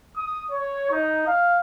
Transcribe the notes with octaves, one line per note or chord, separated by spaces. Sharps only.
D#6
C#5
D#4
F5